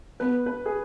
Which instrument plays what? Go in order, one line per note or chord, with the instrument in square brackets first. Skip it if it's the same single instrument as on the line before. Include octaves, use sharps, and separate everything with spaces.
[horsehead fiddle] B3 [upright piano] B4
[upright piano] B4
G#4